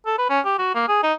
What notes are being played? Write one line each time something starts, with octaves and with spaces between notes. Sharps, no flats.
A4
B4
C#4
G4
F#4
A#3
G#4
D#4